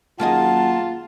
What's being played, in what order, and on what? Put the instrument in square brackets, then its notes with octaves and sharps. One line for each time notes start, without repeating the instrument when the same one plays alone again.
[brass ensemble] F#2 D#3 F#5 [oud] A#3 G#4 D#5 [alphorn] F4 [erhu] A5